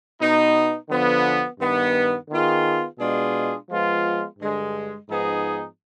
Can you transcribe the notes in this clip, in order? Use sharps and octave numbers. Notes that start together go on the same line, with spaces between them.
B2 B3 D#4
D3 F3 B3
G2 D#3 B3
D#3 B3 F4 G#4
B2 G#3 D4 F4 G#4
F3 G#3 B3 F4
G2 D3 G#3
G#2 F3 B3 D#4 G#4